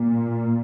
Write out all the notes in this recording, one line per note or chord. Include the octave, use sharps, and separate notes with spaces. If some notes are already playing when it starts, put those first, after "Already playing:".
Already playing: A#2